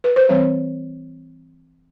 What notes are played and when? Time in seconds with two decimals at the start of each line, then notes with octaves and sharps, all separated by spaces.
0.04 B4
0.16 C5
0.29 E3 G3 C4 C#5